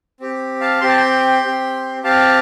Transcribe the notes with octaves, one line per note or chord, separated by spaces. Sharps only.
C4 G4
F5 A5
C4 G4 C6
A5
G5 C6
C4 G4
C4 G4 F5 A5